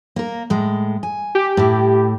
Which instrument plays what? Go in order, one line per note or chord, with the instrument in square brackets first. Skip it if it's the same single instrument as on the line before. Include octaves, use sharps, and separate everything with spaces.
[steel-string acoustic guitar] A#3 A#4
A2 G#3
G#5
[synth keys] G4
[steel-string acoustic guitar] A2 E4